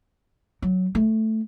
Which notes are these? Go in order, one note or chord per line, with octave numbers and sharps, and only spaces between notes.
F#3
A3